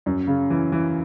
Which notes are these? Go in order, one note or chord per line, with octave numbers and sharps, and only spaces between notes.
F#2
C#3
E3
E3